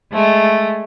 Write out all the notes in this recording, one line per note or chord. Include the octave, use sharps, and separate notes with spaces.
G#3 A3